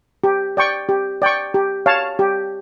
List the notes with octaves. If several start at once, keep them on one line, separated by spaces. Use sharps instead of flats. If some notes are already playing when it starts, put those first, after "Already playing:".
G4
D5 G5 C#6
G4
D5 G5 C#6
G4
C#5 F5 A5
G4